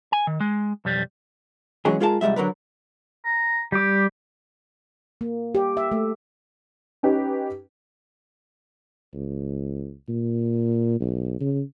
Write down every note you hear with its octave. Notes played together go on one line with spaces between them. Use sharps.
G#5
D#3
G#3
B1 F2 G3
E3 F#3 G#3 C#4 G#4
G#3 F4 G#4 A#4 F#5 A5
C2 F2 G3 G#3 E5
D3 F#3 A#4 B4
A#5
G3 G4 D6
A#3
G4
E5
A3
C#4 D#4 G4 B4
C#2
A#2
B1
C#3